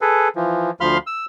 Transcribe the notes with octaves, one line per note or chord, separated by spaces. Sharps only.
G#4 A4 B4
E3 F3
D2 F3 F5 B5 C6 F6
E6